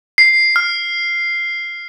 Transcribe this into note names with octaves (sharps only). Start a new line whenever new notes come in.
C7
F6